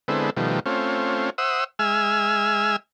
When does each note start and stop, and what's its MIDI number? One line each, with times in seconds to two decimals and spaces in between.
0.08 0.30 50
0.08 0.30 56
0.08 0.30 59
0.08 0.30 60
0.08 0.30 64
0.08 0.30 69
0.37 0.60 47
0.37 0.60 51
0.37 0.60 53
0.37 0.60 55
0.37 0.60 57
0.66 1.30 57
0.66 1.30 60
0.66 1.30 61
0.66 1.30 65
1.38 1.64 72
1.38 1.64 76
1.38 1.64 78
1.38 1.64 87
1.38 1.64 88
1.79 2.76 56
1.79 2.76 76
1.79 2.76 80
1.79 2.76 88
1.79 2.76 89